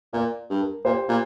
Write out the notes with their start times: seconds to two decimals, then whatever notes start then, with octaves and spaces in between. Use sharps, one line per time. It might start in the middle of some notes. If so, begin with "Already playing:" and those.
0.13 A#2 A#4 D5
0.49 G2
0.61 A#4
0.85 A#2 G4 C5
1.09 A#2